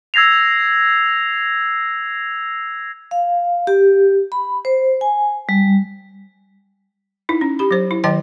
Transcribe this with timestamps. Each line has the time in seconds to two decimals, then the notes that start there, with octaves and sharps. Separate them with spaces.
0.14 E6 G#6 A#6 C7 F7
3.11 F5
3.67 G4
4.32 B5
4.65 C5
5.01 G#5
5.49 G3
7.29 D#4 E4
7.41 C#4
7.59 G4 B5
7.71 F#3 C5
7.91 E4
8.04 D#3 F#3 D#5 G5 A5